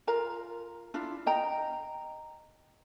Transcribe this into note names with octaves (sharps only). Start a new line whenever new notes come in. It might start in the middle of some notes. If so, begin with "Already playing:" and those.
F4 A#4 A#5
D4 E4 F4
D#5 G5 A#5